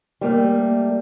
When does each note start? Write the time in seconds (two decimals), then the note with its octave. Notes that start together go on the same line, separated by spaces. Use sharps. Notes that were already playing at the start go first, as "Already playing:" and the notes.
0.21 G3 A3 A#3